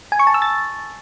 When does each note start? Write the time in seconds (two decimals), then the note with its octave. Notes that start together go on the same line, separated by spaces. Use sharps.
0.12 G#5
0.19 C#6
0.27 A5
0.34 E6
0.42 A6